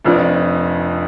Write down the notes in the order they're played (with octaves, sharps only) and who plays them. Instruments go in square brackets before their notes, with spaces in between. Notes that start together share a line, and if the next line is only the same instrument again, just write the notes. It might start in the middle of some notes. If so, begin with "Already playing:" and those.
[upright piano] F1 F2 F3 D4